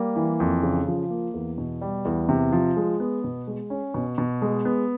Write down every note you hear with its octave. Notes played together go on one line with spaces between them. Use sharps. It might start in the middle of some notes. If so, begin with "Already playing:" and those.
Already playing: G3 A#3
E3
F2
C#3
F3
A#3
E2
B2
G3
E2
C3
F3
G#3
B3
B2
G#3
C#4
B2
B2
G#3
B3